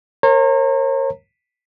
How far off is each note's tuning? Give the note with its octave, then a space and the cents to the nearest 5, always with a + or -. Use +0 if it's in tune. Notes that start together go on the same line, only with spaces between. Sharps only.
A#4 +0 C#5 -40 A#5 -30